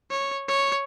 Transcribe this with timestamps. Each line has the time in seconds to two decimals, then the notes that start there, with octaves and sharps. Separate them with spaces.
0.11 C#5
0.48 C#5